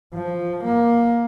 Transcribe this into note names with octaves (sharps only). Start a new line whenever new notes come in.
F3
A#3